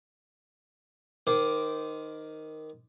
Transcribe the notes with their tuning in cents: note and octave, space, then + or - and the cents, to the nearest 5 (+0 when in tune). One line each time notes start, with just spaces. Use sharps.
D#3 +0 C5 -15 D6 +0